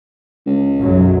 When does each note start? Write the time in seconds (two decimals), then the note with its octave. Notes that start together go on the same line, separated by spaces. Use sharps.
0.46 C#2
0.78 B1 F#2 F#3